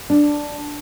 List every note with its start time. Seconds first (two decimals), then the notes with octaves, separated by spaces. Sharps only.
0.10 D4